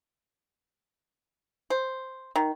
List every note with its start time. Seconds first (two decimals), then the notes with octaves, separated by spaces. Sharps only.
1.70 C5
2.36 D#3